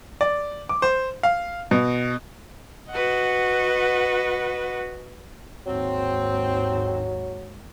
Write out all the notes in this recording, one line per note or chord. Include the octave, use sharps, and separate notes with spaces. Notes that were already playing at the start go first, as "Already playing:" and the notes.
D5
D6
C5
F5
B2
F#4 B4 D#5 F#5
G#1 D#2 G#2 F#3 C4